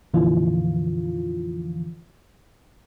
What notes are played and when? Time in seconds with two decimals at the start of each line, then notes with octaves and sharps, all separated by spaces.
0.14 F2 A#2 D3 E3 F3 F4